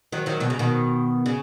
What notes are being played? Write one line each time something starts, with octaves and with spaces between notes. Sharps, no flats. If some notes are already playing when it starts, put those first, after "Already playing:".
D#3 F#3
D#3 F#3
B2 D#3
C#3
B2 D#3
C#3